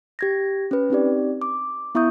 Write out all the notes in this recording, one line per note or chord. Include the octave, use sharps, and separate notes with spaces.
G4 G#6 A#6
C#4 B4
C4 D#4 G4 D5
D6
B3 E4 E5 C#6 D#6 G6